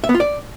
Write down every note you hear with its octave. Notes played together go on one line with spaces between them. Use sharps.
E5
B3
F4
D5